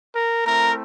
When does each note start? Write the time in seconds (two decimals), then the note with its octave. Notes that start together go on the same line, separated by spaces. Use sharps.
0.16 A#4
0.46 A3 C4 E4 A#4